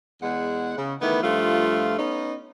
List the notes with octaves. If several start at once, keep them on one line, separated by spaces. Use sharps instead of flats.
E2 G#3 F#5
C#3
D#3 E3 A3 B3
G2 F3 A3 F4
B3 C#4 D#4